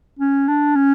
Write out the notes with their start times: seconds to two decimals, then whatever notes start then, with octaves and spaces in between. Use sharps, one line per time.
0.19 C#4
0.48 D4
0.75 C#4